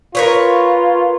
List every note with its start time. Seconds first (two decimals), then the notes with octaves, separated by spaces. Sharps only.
0.15 F4 A#4 B4 C#5